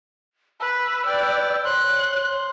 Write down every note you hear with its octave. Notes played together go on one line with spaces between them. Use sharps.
B4 E6
B4 D5 G5
C5 C#5 C6 F#6